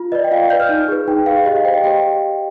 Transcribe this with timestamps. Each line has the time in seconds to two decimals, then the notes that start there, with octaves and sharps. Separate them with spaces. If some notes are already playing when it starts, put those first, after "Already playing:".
Already playing: F4
0.12 B4 D5 D#5
0.24 G5
0.31 F4 F5
0.50 B4 D5 G6
0.60 F6
0.69 D#4
0.88 G#4 B4
1.07 D#4 G5
1.26 G#4 B4 F5
1.45 G4 D#5
1.56 F5
1.65 C5 G5
1.75 D#5
1.84 G4 G5